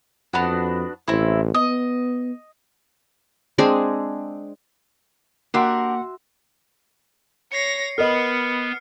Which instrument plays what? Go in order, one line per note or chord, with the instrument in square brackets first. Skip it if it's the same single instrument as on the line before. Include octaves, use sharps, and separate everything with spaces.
[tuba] F2 [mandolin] B3 D4 F#4
[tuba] A1 [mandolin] C4 E4
[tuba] B3 [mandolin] D#5
[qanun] G#3 C4 D4 G#4
[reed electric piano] A#3 [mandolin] D4 G4 A#4 [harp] F#4 E5 C6 [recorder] F#5
[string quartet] C#5 A#6 [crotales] C7 C#7
[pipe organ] B3 [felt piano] A#4 D#5 [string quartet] B4 [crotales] F6